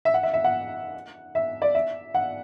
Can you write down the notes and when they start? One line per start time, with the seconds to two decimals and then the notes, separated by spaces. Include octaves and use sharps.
0.05 E5
0.14 F#5
0.23 E5
0.34 E5
0.44 F#5
1.35 E5
1.62 D5
1.75 E5
2.15 F#5